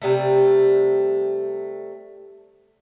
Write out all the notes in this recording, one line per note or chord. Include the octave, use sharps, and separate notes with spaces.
C3 G3 A3